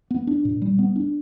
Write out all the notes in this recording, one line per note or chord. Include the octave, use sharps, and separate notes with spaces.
B3
D4
A#2
G3
B3
D4